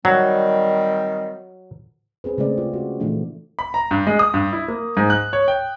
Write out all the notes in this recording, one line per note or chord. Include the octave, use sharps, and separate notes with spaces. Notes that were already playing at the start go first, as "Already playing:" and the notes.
D#3 F#3 G3 C4
C4 G#4 B4
C#3 G#3 A3 C4 D5
F4
F#4 G4
A#2 E3 F3 A3 D4
B5
A#5
G2
G#3
D#6
G2
E4
A#3
G#2
F#6
C#5
G5